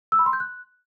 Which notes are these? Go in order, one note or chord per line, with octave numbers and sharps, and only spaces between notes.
E6
B5
C6
G6
F#6